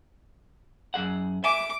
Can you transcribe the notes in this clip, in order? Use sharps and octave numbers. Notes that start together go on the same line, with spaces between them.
F#2 G#4 F#5
E5 G#5 D6